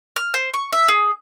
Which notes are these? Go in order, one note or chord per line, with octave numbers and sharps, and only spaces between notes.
F6
C5
C#6
E5
G#4